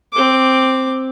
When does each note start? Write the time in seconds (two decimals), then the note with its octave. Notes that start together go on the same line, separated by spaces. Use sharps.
0.13 C4 D6